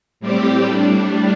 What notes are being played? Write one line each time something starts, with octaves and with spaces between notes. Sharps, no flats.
A2 G3 C4 G4
A2 G3 D4